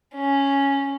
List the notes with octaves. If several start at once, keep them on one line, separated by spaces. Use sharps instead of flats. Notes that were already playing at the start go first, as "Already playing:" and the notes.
C#4